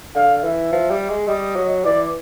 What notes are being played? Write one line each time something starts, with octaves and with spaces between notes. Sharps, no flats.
D3 F5
E3 E5
F3
G3
G#3
G3 D#5
F#3
E3 D5